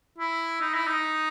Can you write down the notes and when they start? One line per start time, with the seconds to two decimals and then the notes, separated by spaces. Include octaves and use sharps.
0.18 E4
0.61 D#4
0.74 E4
0.87 D#4